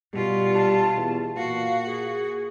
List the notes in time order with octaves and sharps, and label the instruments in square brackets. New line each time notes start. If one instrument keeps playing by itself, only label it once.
[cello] B2 F4 [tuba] G3
[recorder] A5
[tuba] E2
[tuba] A#2 [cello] F#4 [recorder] F5
[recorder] G#4